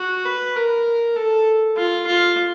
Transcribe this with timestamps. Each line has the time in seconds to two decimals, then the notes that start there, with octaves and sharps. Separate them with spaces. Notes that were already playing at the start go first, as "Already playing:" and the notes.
Already playing: F#4
0.25 B4
0.56 A#4
1.16 A4
1.77 F4
2.07 F4